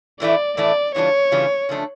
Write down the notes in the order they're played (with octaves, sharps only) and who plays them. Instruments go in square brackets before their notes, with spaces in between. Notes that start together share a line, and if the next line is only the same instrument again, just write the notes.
[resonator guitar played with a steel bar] A2 E3 A3 E4 [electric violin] D5
[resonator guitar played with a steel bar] A2 E3 A3 E4 [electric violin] D5
[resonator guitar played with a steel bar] C#3 E3 G3 D4 F4 [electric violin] C#5
[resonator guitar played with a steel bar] C#3 E3 G3 D4 F4
C#3 F3 A3 D4